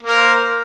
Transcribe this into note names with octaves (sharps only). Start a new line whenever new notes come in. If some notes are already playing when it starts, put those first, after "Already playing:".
A#3 A#4 C5